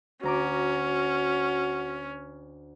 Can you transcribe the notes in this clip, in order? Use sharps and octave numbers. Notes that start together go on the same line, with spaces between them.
D2 C#4 F#4 A#5 D6